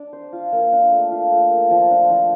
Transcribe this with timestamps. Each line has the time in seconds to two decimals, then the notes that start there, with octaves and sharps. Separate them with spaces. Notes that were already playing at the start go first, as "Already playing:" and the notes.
Already playing: D4 D5
0.13 C5
0.33 F4
0.52 A#3
0.73 D4
0.91 A3
1.11 F4
1.32 A3
1.51 A#3
1.71 F3
1.91 D4
2.10 F3